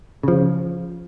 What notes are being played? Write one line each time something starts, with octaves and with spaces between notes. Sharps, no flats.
C#3 F3